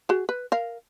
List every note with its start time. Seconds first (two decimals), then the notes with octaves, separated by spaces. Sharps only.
0.09 F#4 G#4
0.29 B4
0.52 A#4 F5